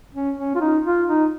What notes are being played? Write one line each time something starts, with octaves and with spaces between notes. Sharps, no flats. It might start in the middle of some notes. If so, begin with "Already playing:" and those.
C#4
C#4
F4
D#4
F4
D#4